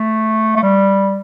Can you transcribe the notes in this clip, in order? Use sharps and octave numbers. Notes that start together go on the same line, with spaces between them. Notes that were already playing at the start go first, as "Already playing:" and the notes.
Already playing: A3
A3
G3